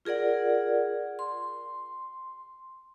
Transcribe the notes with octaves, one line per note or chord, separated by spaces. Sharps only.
F4 G#4 A#4 D5 F#5
C6